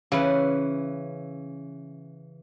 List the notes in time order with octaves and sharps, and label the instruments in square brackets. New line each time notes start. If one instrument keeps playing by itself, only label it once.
[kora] C#3 B4 [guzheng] E3 C#4